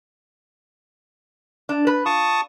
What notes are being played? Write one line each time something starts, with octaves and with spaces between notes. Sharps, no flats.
D4
B4
F4 A5 C#6 D#6